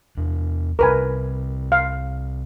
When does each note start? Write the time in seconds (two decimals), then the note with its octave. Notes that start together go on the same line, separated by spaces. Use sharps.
0.17 E2 D4
0.79 C2 C3 A#4 B4 G#5
1.72 F5